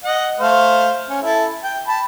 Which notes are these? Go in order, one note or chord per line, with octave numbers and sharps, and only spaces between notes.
D#5 F#5
A3 C5 F5
C#4
E4 A4
G5
A5 B5